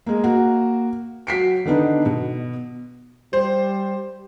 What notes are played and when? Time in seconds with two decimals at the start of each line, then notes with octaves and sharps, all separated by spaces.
0.06 G#3 A#3
0.24 A#3 F#4
1.27 F#3 B6 C7 D7
1.65 D3 D#3 B3 D4 D#4
2.06 B2
3.33 G3 C5